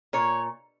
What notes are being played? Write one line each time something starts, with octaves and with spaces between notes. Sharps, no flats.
A#2 C#5